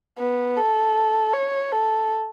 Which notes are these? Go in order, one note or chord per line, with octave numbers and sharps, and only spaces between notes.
B3
A4
C#5
A4